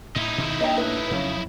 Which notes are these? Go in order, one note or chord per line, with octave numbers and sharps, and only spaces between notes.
A2 D#4 E4
B2 D#3
A#3 D4 D#5 G5 A#5
A2 B4
F2 C#3 F#3